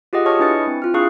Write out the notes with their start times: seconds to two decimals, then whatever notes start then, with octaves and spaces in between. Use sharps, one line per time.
0.13 F4 G4 G#4 D#5 F#5
0.26 C#5 D#5 A5 C#6 D#6 F6
0.39 D4 E4 B4 G#5 A6 C#7
0.67 C4
0.82 F4 F6
0.94 D4 E4 G#4 F5 C#6 F#6